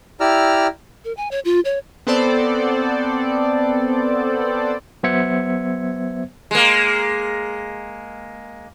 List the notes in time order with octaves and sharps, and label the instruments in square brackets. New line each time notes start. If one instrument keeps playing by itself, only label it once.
[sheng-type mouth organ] E4 G4 D5 A#5 E6 F6
[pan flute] A#4
G#5
C#5
F4
C#5
[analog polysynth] B3 C4 A4 C5 D5
[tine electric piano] F#3 B3 C5 E5 G#6 C#7
[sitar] G#3 A#3